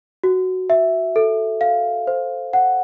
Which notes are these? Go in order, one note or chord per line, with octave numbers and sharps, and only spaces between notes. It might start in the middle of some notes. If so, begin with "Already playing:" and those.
F#4
E5
A4
F5
C5
F#5